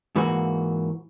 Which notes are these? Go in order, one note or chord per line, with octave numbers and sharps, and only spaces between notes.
G#2 E3 A#3 F#4